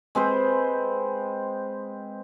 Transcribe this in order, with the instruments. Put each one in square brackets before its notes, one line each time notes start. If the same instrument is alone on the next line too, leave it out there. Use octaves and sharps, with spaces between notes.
[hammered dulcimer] G#3 C4 B4 C5